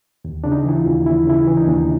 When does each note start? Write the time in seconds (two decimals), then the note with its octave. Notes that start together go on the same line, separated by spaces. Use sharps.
0.25 D#2
0.44 C#3 D4
0.52 D#4
0.65 E3 E4
0.79 F4
0.86 D#2
1.06 D#2 E4
1.27 C#3 E4
1.34 D#4
1.47 E3
1.57 D#4
1.61 D4
1.68 D#2